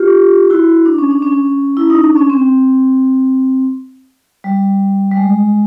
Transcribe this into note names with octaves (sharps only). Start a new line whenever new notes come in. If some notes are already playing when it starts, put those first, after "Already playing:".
Already playing: F4 G4
E4 F#4
D4
C#4
D4
C#4
E4
D#4
D4
C#4
C4
G3
G3
G#3